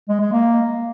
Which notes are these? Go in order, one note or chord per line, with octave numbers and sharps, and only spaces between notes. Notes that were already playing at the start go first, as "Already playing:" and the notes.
G#3
G#3
A#3